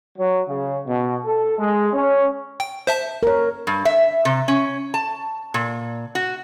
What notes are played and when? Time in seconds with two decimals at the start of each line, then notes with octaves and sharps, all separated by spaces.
0.17 F#3
0.47 C#3
0.87 B2
1.25 A4
1.57 G#3
1.93 C#4
2.60 G5
2.87 C5 E5 A5
3.23 A#4 C#5
3.67 G2
3.85 E5
4.25 C3
4.48 C#4
4.94 A5
5.54 A#2
6.15 F#4